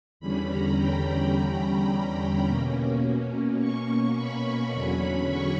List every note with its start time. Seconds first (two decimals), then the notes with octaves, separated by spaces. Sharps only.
0.20 E2 D3 G3 C#4 B5
0.49 A#5
0.77 G5
1.33 A#5
2.46 B2 A#3 C#4
3.59 C#6
4.16 B5
4.72 E2 D3 F#3 C#4 B5
5.29 C#6